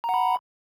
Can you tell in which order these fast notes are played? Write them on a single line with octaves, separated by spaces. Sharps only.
A#5 F#5 B5